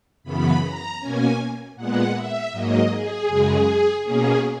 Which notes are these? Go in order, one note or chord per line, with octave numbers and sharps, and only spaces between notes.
F#2 C#3 E3 B3 B5
A#5
B2 A#3 C#4 G#5
A#2 G#3 B3 F#5
E5
G#2 F#3 A#3 D#5
G#4
F#2 C#3 G#3
B2 A#3 C#4 G#4